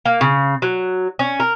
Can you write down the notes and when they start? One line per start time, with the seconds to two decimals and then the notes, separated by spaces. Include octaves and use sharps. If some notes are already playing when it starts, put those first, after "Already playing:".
0.06 A#3
0.21 C#3
0.62 F#3
1.19 C#4
1.40 A#4